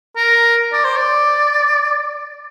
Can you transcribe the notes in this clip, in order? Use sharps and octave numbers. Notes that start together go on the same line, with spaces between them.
A#4
D5
C5
D5